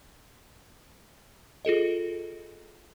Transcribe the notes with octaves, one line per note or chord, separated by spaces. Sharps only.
F4 G#4 A4 D#5